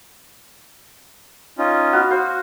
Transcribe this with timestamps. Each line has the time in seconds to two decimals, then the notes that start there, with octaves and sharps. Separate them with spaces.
1.58 C#4 D#4 F4
1.93 B3 F#4 F5
2.11 F#4 C5